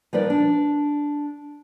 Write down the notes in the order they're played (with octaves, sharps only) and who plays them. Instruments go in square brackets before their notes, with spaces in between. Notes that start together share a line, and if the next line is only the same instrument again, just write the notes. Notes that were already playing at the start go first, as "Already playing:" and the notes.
[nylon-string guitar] F3 G3 D#4 A#4 B4 D5
D4